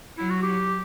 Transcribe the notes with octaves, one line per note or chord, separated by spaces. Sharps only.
F#3 E4
F#4
G4